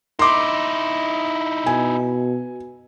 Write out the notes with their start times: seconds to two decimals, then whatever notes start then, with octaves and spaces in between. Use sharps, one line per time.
0.19 D#4 E4 C6 D6
1.66 B2 G#5